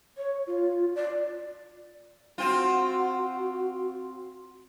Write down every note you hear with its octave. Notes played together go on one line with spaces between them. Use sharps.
C#5
F4
D5
C4 F4 F#4